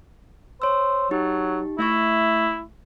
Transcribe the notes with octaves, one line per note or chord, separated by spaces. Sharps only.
C5 C#5 E6
F#3 D#4 G4
A3 E4 E5 C#6